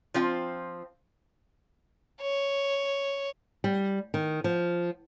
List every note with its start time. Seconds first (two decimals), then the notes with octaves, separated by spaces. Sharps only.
0.14 F3 C4 F4
2.21 C#5
3.64 G3
4.14 D#3
4.44 F3